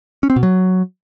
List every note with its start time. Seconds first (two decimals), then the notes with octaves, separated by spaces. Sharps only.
0.23 C#4
0.30 C4
0.36 B2
0.43 F#3